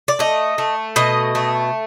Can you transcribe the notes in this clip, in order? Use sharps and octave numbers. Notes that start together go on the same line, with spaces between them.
D5
A3 D#5
A3
B2 D#5
A3